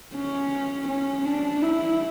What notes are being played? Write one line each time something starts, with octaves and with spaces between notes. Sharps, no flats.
C#4
C#4
D4
E4